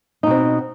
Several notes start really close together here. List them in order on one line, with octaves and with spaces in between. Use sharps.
D#4 B2 C4